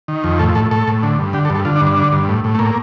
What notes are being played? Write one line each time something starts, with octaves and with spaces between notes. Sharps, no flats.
D#3
F2
A2 A4
A2 A4
A2 A4
A2
D3
G2
D3 G4
A4
G2
A4
D3 F4
D4
G2
D4
D3
G2
A2
A2
A3
A2 A#3